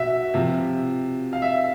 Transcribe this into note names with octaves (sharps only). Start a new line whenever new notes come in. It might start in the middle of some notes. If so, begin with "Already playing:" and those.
Already playing: B2 E5
C3 F3
F5
E5